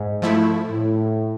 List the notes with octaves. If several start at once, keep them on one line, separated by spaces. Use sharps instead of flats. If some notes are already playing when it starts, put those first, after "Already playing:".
Already playing: G#2
F3 A3 E4
A2